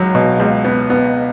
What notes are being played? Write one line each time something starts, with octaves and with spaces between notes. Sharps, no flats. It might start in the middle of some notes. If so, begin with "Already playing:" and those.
Already playing: C#2 F#3
B2
C#2
B3
B3